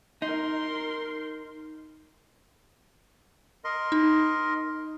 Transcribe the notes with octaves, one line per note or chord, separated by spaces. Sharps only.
D#4 A#4 C6
A#4 D#5 C6
D#4